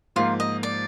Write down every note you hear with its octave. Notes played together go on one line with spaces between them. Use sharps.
G#2 F3 A#3 F4
D#5
D5